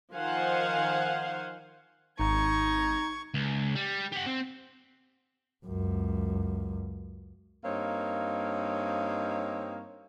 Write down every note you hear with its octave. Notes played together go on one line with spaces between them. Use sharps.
D#3 F3 C5 F5 F#5 G#5
G#1 D#4 C#6 G#6
C#2
G3
G4 F#5
C4
C#2 F#2
G2 A#3 C4 D#4 C#5 F5